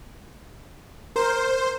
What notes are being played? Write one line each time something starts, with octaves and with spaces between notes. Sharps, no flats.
A#4 C5